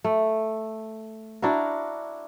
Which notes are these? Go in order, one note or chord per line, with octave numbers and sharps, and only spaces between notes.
A3
D4 E4 F#4 A#4